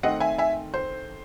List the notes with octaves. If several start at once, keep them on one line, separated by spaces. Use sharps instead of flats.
D#3 A3 C4 D#5 F#5
E5 G#5
E5 G#5
C5